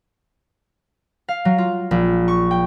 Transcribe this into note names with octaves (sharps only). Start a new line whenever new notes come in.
F5
F#3
F4
A#1
C#6
G5